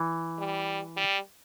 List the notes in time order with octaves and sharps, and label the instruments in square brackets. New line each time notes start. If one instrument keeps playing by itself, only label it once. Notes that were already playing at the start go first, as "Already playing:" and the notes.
Already playing: [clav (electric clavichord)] E3
[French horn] G3
G3